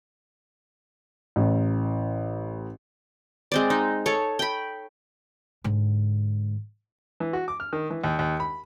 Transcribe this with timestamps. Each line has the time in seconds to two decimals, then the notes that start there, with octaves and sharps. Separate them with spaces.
1.36 A1
3.52 G#3 C4 D5
3.70 D#4
4.06 A4 C#5
4.39 G5 B5
5.64 G#2 D3
7.20 E3
7.33 F#4
7.48 D6
7.60 F6
7.73 D#3
7.90 E3
8.04 D#2
8.19 D#2
8.40 B5